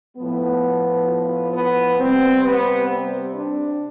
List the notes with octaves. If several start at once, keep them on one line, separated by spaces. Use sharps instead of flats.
A2 F3 B3
F4
B3
C3 G3 B3 C4
B3
C4
D4